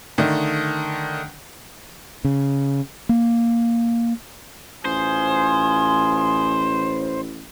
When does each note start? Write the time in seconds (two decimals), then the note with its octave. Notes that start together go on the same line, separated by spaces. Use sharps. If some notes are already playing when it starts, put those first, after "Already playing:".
0.18 D3 D#3 A3
2.25 C#3
3.09 A#3
4.85 A1 F4 C5 G#5 D#6